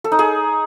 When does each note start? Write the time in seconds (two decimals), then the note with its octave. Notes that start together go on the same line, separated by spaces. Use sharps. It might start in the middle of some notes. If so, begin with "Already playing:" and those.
0.04 A4
0.12 D#4
0.19 G#4